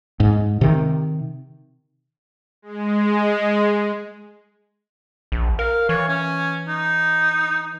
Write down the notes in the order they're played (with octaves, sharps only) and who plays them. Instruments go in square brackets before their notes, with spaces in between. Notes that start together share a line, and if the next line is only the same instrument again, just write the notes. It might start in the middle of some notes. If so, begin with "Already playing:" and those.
[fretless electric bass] G#2
C3 D#3
[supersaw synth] G#3
[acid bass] A#1
[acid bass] A#4 [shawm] F5
[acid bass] E3 [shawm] C#5
[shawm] C#4
D#4